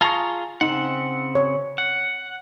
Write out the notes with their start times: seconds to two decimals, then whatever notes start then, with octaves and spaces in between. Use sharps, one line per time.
0.01 F4 G#4 A5 A#5 C#6
0.61 C#3 C4 D#4 F#5 C6
1.35 C#5
1.78 F#5